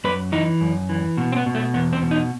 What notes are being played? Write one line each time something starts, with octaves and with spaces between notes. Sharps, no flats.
F#2 B4
E3 D#4
F#2
E3
B2
C4
B3
B2
A3
E2 B3
C4
B2
D#4